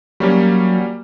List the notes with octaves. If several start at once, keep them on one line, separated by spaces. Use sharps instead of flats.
F#3 G3 A#3 C#4